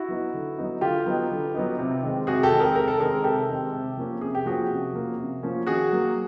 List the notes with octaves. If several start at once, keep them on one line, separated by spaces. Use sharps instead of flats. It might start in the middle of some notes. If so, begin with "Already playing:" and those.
Already playing: E4 F#4
F#3 B3 D#4
D3
F#3 B3 D#4
D3 F4 G4
F#3 B3 D#4
D3
F#3 B3 D#4
C3
D#3 G#3 C4
C3 F#4 G#4
G4 A4
D#3 G#3 C4
G#4 A#4
C3 A#4
A4
D#3 G#3 C4 G#4 A#4
C3 G4 A4
D#3 G#3 C4
C3
F3 A#3 C#4
C3 G#4
G4
F3 A#3 C#4 F#4 G#4
C3
F3 A#3 C#4
C3
F3 A#3 C#4
D#3 F#4 G#4
F#3 A#3